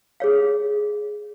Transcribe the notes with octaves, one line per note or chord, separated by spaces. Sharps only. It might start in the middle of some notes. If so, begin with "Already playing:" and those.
G#4 C#5 F5